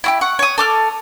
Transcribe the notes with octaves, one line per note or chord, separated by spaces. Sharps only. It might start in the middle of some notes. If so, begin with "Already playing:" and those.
E4 F#4 G4
F#5 C#6
C#5 D#6
A4 D6 F6